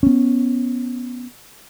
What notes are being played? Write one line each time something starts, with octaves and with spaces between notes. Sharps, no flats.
B3 C#4